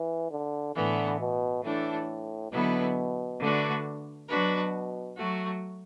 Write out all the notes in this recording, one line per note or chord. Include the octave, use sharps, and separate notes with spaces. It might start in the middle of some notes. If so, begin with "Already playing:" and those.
Already playing: E3
D3
A2 D3 E3 B3
B2
A2 E3 A3 D4 A4
B2 D3 F#3 B3 E4 B4
D3 A3 D4 F#4 B4
B2 F#3 D4 F#4 B4
F#3 A3 F#4